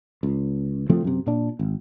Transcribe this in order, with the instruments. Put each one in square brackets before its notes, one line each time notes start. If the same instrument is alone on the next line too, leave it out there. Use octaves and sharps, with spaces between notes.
[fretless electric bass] C#2
C3 F3 A3 C4
F#2 C3
A#2 D4
G#1